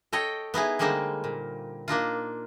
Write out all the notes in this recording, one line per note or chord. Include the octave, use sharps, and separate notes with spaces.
A4 C#5 D#5 G5
B3 D#4 E4 G#4
D3 G3 G#3 A#3 D#4 C5
A#2
A#3 D4 D#4 F4